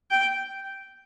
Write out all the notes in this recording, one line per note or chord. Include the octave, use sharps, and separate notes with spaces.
G5